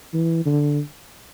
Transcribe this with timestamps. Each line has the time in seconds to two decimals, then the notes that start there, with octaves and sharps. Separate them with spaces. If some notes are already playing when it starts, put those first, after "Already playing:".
0.13 E3
0.46 D3